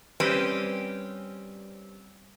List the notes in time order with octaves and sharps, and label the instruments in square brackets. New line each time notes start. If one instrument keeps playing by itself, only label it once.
[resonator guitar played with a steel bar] G3 C4 C#4 G4 B4 C5